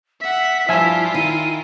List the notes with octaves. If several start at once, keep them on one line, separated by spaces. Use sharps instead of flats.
E5 F#5 B6
G2 F3 E4 F4 E5 G#5 E6
D#3 D#7